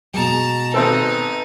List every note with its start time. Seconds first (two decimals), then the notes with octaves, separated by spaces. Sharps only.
0.14 B2 G#3 A5 A#5
0.74 G#1 C4 D#4 A4 B4